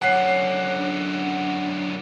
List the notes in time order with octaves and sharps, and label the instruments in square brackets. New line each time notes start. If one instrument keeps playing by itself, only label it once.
[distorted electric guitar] F#2 D3 [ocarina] C#5 [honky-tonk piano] F#5 C7
[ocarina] D4